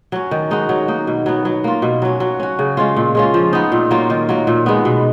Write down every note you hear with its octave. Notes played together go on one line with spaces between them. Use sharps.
F#3 C#4
D#3
G#3 D#4 F#4
F#3
A#3 D#4
B2
F#3 B3
F#3
A#3 F4
B2
F#3 C#4
F#3
C#4 F#4
C#3
G#3 C#4 F4
A#2
G#3 C#4 F4
F3
B3 D#4
A#2
F#3 A#3 F4
D#3
F#3 A#3
A#2
G#3 B3
B2